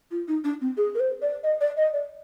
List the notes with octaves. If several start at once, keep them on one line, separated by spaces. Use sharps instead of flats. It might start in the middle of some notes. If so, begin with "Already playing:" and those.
F4
D#4
D4
C4
G#4
A#4
C5
D5
D#5
D5
D#5
D5